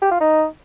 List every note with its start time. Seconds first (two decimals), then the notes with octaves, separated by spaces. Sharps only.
0.01 G4
0.11 F4
0.20 D#4